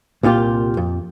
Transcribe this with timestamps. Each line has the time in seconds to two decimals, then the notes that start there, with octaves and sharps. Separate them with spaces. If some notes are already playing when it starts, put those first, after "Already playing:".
0.23 C2 A#2 F4 G4
0.77 F2